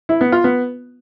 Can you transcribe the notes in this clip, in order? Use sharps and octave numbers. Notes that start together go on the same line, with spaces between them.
E4
B3
F4
B3